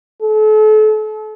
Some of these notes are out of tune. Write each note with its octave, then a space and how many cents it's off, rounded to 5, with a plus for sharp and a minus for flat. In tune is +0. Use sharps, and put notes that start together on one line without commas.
A4 -35